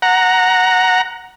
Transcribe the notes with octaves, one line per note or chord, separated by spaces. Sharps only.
F#5 A#5